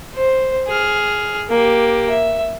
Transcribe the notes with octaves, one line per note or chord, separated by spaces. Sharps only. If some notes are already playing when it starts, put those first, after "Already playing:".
C5
G#4 F6
A#3 G4
E5